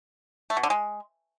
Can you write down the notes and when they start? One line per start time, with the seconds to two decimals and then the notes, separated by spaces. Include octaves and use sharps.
0.50 A3
0.57 B2
0.63 D3
0.70 G#3